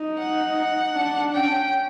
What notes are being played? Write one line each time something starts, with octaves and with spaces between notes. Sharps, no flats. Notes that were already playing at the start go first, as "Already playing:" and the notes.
Already playing: D#4
F#5
D4
C#4 G5